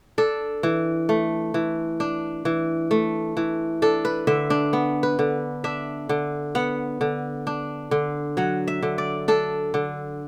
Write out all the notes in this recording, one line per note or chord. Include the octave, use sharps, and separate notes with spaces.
D4 A4
E3
A3
E3
D4
E3
A3
E3
D4 A4
B4
D3 E5
D4
B3
B4
D3
D4 E5
D3
B3 F#5
D3
D4
D3
F#3 F#5
E5
D3
D5
D4 A4
D3